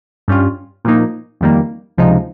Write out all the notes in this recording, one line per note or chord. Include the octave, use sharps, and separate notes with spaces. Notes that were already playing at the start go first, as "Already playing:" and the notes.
G2 G3 C#4 F4
A#2 F3 A#3 D#4
F2 D#3 G3 A#3
C#2 C3 F3 G#3 D#4